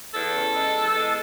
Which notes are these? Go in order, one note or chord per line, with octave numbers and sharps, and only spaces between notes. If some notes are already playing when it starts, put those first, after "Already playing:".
E2 A4
C#3
G#3
E2
G#3